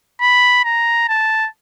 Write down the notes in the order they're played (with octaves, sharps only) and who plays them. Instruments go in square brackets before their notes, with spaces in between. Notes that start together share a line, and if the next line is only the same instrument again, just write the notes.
[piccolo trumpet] B5
A#5
A5